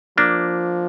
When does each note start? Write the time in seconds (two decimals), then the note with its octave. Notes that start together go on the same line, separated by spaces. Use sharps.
0.18 F3 A#3 D4